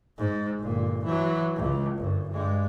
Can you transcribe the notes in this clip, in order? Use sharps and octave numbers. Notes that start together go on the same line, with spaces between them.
G#2
G1 A#2
E3 F#3
C#2
G1 F#2
G2 G#3